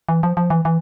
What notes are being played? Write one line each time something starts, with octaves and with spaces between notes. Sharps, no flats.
E3
F3
F3
E3
E3